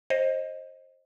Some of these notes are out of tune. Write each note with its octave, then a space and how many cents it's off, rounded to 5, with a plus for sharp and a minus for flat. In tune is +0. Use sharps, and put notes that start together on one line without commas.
C5 +20 D#5 +0